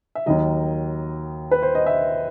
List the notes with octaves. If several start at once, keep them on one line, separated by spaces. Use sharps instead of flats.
E5
D#2 D#3 F#3 D#5
B4
C5
D#5
E5